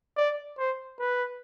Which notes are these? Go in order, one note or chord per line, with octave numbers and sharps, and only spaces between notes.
D5
C5
B4